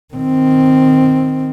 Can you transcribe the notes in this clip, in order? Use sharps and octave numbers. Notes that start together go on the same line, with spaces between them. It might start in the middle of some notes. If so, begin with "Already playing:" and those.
D#3 C4